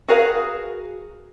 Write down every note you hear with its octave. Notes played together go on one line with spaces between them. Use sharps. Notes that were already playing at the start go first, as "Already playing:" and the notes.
F#4 G#4 A#4 B4 F5